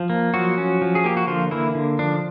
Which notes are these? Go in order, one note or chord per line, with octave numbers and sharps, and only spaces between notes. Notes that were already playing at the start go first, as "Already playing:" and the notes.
Already playing: F3
A#3
F3 F#3 F#4
C#4
F3
G#4
A#3 G4
F#4
D3 F3 F4
E3 A#3 E4
D3
F3 D4